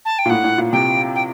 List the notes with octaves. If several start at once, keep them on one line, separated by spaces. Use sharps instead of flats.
A5
G5
A#2
A2 F#5
A2
A#2
C3 G5
G5